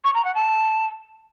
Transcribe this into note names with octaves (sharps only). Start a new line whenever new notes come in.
C#6
A#5
F#5
A5